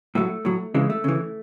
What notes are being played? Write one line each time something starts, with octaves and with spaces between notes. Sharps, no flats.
A2 F#3 A3
A2 F#3
C#3 E3 G#3
A3
C#3 E3